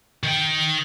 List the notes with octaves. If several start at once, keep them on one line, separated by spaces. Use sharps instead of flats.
D#3 G5